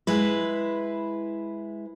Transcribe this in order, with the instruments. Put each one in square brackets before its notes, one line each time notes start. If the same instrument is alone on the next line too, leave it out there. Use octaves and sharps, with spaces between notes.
[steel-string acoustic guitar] G#3 E4 B4